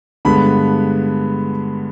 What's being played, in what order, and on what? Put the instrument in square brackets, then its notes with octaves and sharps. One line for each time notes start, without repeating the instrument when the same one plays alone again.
[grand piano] G2 D3 G#3 B3 B5